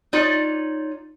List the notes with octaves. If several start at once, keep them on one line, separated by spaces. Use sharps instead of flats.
D#4 F4 C#5 D5